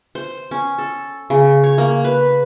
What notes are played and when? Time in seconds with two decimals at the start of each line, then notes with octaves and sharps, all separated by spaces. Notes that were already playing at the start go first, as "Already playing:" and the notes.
0.15 C5
0.51 C#4
0.78 A4
1.30 C#3
1.64 C#5
1.78 A#3
2.04 B4